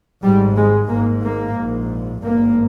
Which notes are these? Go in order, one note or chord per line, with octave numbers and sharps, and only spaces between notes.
G#1 G#2 G3
G#3
G#1 G#2 A#3
A#3
A#1 G#2
G#1 G2 A#3